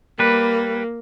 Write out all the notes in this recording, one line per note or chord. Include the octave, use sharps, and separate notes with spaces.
G3 A#3 B4